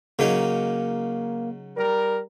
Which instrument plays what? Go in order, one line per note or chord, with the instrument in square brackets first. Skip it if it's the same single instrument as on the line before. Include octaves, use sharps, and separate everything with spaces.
[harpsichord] C#3 F#3 D#4 [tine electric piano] A#3
[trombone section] G3 A#4